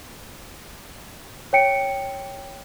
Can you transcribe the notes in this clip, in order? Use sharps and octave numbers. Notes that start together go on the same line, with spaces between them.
C#5 G5 C#7 D7